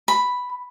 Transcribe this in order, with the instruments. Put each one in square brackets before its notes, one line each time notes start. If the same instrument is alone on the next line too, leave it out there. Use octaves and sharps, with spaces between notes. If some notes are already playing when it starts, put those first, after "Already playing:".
[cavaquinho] B5